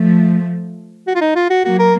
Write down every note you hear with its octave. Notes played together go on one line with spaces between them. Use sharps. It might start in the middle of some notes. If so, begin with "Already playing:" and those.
Already playing: F3 A3
F#4
F4
D#4
F4
F#4
F#3 A#3 F#4
A#4